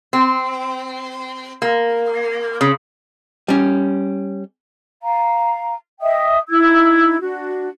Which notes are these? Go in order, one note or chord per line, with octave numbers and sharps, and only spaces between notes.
C4
A#3
C#3
G3 C#4
F5 A#5
D#5 E5 G5 D#6
D#4 E4 E6 G#6
D4 F#4